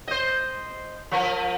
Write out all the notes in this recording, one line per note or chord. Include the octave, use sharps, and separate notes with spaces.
C5 D#5
F3 A#4